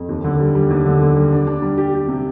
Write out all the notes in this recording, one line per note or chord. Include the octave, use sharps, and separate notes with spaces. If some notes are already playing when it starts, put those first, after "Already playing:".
Already playing: F2
D#2
D3
G3
G3
D#2
D3
D3
G3
D4
D4
G3
G4
G4
C3